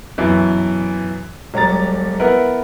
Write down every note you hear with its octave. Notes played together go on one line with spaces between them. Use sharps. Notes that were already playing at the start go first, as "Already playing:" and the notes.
F#2 B2 E3 E4
E1 F#3 G3 A#5 A6
B3 E4 A#4 B4 F#5